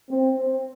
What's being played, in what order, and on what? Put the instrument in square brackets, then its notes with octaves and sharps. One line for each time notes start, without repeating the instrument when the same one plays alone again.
[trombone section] C4
C4